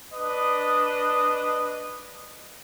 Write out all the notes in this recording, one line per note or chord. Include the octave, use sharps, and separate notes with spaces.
D4 B4 D#5 D#6